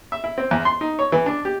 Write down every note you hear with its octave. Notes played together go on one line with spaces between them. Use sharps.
E5
E4
C4
E2
C6
D#4
C#5
E3
D4
G4